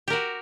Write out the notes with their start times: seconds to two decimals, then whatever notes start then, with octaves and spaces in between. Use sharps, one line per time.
0.08 G4
0.10 A#4
0.13 F#4